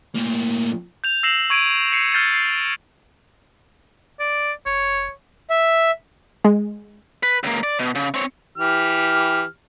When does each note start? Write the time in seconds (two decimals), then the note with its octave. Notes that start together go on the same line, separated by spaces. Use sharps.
0.15 A2 A#3
1.04 G6 F7
1.23 E6 A#6 C7 E7 F#7
1.50 C#6 G#6 D7 D#7
1.92 C7 C#7
2.12 F6 G6 A6 C7 C#7 D#7
2.33 C7
4.20 D5
4.66 F1 C#5
5.50 E5
6.44 G#3
7.23 B4
7.43 C#2 A#3
7.63 D5
7.79 B2
7.95 C#3
8.14 C4 C#5
8.58 E3 G4 F6